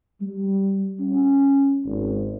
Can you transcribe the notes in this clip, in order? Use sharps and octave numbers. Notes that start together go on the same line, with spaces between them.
G3
C#4
G#1